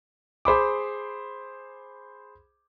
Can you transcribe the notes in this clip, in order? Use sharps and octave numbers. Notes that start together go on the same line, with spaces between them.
G#4 C5 B5 D6